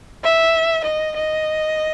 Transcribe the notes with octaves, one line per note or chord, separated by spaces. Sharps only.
E5
D#5
D#5